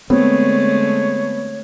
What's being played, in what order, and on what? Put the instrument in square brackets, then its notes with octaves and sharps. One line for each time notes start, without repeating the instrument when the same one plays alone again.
[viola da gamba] D3 G#3 A3 [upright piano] B3 [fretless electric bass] C4 [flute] C#5